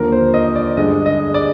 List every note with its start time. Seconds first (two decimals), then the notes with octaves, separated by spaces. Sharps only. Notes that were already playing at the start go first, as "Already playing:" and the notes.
Already playing: D#2 D3 F3 A#4
0.12 C5
0.34 D#5
0.55 D5
0.77 G2 D3 G#3 D#5
1.06 D#5
1.34 D5